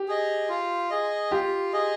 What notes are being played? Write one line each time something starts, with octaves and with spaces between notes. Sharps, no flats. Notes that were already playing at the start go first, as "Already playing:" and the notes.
Already playing: G4
G#4 D#5
F4
G#4 D#5
F4 G4
G#4 D#5